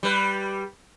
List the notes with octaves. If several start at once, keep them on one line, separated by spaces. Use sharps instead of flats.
G3 B4